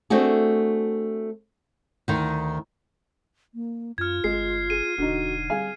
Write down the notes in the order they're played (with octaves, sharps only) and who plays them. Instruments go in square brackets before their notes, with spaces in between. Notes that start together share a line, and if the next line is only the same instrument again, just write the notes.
[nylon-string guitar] A3 C4 D4 F#4 G#4
D2 D#3
[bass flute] A#3
[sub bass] F#2 [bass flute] F4 [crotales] F6 G#6
[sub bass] G1 [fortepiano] G#3 [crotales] C7
[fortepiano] G#4 [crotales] D#7
[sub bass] E1 [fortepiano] D3 D#4 [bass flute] F#4
[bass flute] G3 [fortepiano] G#4 F5 G#5